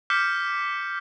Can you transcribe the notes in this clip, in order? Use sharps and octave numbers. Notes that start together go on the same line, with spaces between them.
D6 F6 G6 B6 C#7